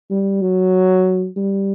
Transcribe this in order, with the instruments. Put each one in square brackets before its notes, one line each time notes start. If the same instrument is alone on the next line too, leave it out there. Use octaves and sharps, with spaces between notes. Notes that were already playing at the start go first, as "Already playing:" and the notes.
[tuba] G3
F#3
G3